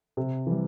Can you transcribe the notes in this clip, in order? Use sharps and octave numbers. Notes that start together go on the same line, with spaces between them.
C3
E3 G3